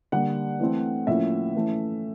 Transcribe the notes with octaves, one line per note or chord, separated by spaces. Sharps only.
D3 G3 A#3 F#5
E3 A3 C4
A2 F3 A#3 C#4 E5
E3 A3 C#4